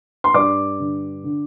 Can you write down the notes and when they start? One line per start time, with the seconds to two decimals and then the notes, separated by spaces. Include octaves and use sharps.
0.24 C6
0.34 G2 D5 D6
0.80 D3
1.24 D3